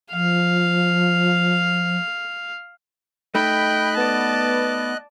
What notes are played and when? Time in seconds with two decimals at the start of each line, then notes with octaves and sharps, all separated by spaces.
0.12 F3 F5
3.35 A3 D#4 D#5 G5 B5 F#6
3.97 B3 D5 A5